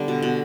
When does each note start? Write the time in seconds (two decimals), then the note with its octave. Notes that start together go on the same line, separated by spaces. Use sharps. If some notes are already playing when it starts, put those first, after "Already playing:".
Already playing: D3 G3 B3
0.08 B2
0.22 B2